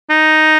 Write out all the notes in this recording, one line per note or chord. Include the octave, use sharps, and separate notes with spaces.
D#4